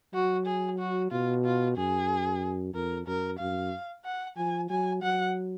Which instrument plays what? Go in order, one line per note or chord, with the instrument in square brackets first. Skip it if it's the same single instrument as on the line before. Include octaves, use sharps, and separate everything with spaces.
[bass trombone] F#3 [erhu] F#4
[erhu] G#4
F#4
[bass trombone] B2 [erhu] F4
[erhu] F4
[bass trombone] F#2 [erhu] G#4
[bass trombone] F2 [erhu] A#4
[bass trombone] F#2 [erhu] A#4
[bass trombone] F#2 [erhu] F5
[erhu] F#5
[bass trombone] F3 [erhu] G#5
[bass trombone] F#3 [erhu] G#5
[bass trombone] F#3 [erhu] F#5